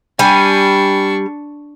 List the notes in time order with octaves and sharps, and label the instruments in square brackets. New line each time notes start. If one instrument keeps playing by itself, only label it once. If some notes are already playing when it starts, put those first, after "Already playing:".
[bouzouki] G3 G#5 [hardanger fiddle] D4 C#6